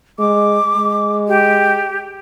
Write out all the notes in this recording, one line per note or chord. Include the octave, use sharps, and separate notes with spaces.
G#3 D6
G#3
G4